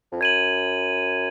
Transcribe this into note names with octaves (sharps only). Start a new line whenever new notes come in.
F2
F#2 G#6 D#7 F#7